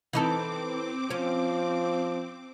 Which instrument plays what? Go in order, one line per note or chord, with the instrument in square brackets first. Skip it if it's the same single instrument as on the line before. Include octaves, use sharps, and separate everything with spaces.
[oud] E3 D#4 A4 [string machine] C4 D6
[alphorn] F3 [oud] C#4